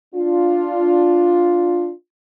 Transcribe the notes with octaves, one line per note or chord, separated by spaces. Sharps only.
D4 F4